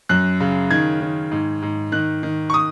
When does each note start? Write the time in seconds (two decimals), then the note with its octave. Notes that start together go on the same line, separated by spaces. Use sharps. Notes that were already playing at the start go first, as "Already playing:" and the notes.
0.09 F#2 F#6
0.40 C#3
0.71 D#3 G#6
1.01 D#3
1.31 G#2
1.62 G#2
1.92 D#3 F#6
2.23 D#3
2.50 C#6
2.54 D#6